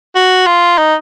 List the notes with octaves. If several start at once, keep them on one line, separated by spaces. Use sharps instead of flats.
F#4
F4
D#4